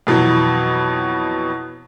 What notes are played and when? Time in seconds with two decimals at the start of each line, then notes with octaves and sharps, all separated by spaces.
0.07 F2 B2 E3 F#3